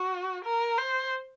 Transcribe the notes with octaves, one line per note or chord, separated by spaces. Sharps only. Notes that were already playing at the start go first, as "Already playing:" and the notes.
Already playing: F#4
A#4
C5